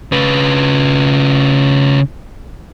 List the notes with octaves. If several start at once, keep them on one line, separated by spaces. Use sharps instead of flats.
C#3 B4